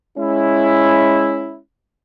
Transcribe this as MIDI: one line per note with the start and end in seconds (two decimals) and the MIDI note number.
0.19 1.58 56
0.19 1.58 61
0.19 1.58 64